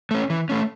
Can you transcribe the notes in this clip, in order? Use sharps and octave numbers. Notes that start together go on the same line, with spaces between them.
A3 C#4
E3
A3 C#4